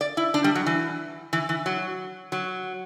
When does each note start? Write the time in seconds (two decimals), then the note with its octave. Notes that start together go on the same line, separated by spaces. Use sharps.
0.01 D5
0.17 E4
0.34 D4
0.44 G3
0.55 F#3
0.66 E3
1.33 E3
1.49 E3
1.66 F#3
2.32 F#3